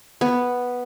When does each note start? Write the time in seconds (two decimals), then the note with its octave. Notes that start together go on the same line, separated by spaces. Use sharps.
0.21 B3